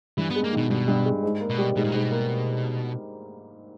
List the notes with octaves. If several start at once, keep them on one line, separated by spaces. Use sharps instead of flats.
G2 E3
B3
G#3
A#3
B2 D#3
G2 B2
G2
G#3
G#2
A#3
B2
G3
G#2 B2
A#2
G#2 B2
A#3